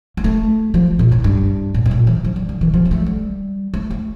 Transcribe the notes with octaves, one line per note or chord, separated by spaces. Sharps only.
A#3
A3
F3
A#2
A2
G2
A2
A2
A#2
E3
F3
G3
D3
E3
F3
A#3
A3
G3
A3
A3